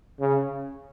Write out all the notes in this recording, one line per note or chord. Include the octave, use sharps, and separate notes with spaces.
C#3